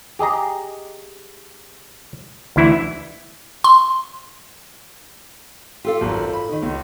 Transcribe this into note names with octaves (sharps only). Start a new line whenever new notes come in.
G4 G#4 D#5 A#5
D2 E3 E4
C6
F4 G4 A4 F5
G#1 F#2
B5
D#3 C#4 D#4
C#2